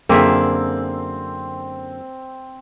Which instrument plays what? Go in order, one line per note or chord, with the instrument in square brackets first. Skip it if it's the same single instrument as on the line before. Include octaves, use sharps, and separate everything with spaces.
[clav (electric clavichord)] F#2 D3 [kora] A#3 G#4 E5 [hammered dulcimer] C4